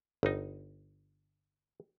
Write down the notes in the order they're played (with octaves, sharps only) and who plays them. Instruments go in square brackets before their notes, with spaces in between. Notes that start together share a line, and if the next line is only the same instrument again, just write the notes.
[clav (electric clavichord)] G1 D#4